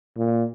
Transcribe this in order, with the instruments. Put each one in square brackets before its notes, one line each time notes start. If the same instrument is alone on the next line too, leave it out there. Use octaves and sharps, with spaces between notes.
[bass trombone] A#2